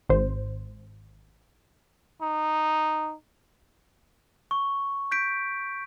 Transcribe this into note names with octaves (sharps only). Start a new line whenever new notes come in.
G#1 C5
D#4
C#6
G6 B6 D7